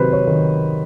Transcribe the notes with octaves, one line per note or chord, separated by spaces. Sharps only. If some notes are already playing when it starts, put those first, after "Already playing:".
Already playing: C3 D#3 F#3 B4 C5
C#5
D#3